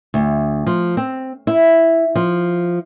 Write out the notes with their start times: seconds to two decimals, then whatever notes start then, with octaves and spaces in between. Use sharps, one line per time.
0.14 D2
0.67 F3
0.97 C4
1.47 E4
2.15 F3